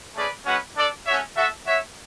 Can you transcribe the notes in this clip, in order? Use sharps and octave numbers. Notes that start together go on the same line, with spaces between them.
A3 C#4 G#4 B4 D5
G#3 C#4 F#4 B4 F#5
D4 A4 D5
A3 C#4 F#4 C#5 E5
F#4 A4 E5
F#4 C#5 E5